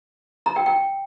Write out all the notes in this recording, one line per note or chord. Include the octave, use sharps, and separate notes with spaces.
A#5
G5
G5